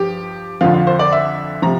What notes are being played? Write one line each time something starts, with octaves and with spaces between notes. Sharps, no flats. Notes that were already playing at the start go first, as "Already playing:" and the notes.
Already playing: G2 F3 G4
F2 D3 F3 F4
F4
C5
D5
E5
C3 F3 A#5